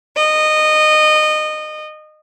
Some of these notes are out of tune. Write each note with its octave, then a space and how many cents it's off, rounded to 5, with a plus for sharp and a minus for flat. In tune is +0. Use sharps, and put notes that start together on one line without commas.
D#5 -20